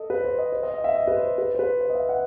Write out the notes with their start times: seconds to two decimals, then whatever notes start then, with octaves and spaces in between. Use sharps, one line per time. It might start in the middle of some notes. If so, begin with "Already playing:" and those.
Already playing: A4 D#5
0.10 B4
0.24 C5
0.39 D#5
0.52 C5
0.63 D#5
0.74 D#5
0.84 E5
0.96 D#5
1.07 B4
1.16 C5
1.38 B4
1.55 C5
1.59 B4
1.81 C5
1.90 D#5
1.95 E5
2.09 F#5